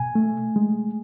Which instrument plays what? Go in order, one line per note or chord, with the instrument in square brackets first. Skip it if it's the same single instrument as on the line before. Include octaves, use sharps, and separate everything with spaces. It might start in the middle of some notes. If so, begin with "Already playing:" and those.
Already playing: [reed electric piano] B2 G#5
A3
G#3